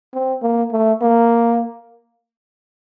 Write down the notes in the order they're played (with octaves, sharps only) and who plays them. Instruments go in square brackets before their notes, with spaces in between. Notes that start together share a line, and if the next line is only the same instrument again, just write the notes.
[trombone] C4
A#3
A3
A#3